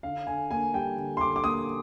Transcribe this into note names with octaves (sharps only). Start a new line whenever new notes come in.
D3 F5
D3 G#5
A#3 G#5
G3 G5
D3
C6
D3 D6
D6
A#3 D#6